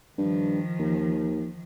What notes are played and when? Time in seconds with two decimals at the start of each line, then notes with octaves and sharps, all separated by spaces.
0.18 G2 D#3 F3
0.79 D#2